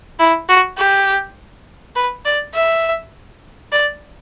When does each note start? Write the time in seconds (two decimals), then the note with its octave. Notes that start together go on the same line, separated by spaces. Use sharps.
0.19 E4
0.49 F#4
0.78 G4
1.96 B4
2.25 D5
2.55 E5
3.72 D5